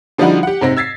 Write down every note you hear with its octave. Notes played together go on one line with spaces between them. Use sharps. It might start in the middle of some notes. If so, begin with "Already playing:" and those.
D3 F3 G3 D#4 E4 F#4
G4 F#5
G#2 C3 C4 A#6
E6 G#6 A6 B6 C7